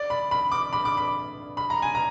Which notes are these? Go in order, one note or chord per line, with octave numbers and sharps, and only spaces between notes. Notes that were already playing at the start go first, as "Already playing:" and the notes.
Already playing: D5
B5
B5
D6
B5
D6
B5
B5
A#5
G#5
A#5